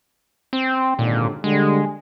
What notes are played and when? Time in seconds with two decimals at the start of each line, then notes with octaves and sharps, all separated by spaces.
0.53 C4
0.99 G#1 D#2 A#2 D3
1.44 D3 G3 G#3